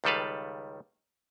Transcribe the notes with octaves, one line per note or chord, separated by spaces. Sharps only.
C#2 D#3 G3 A4 B4 F5